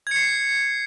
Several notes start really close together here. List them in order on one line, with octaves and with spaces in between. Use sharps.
G#6 C#7 C7